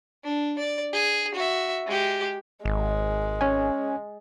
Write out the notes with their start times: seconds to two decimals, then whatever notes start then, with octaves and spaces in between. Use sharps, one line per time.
0.24 D4
0.59 D5
0.93 G#4
1.35 F#4 E5
1.87 G#3 G4
2.65 G#1 G#3
3.41 C#4 G#5